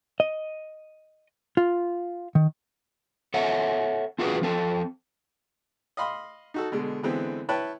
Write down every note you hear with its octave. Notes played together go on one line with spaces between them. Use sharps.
D#5
F4
D#3
A4 C#5 E5 F#5
C4 F4 F#4 G#4 B4
F3 C4 A4
D#5 F5 B5 C6
D#4 F#4 A4
B2 D3 G#3
D3 E3 G#3 B3 C4
E4 B4 C#5 G5 A5